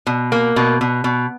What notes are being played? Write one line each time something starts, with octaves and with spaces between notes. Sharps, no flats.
B2
A#3
B2
B2
B2